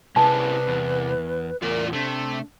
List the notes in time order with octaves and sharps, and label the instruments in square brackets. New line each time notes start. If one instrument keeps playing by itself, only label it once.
[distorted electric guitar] C2 [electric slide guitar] C#4 E4 G#4 [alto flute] B4 [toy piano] A5
[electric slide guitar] E2
[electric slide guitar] E2 A2 [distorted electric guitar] F4 D5 [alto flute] A#4
[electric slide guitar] C3 [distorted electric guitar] A3 [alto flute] D4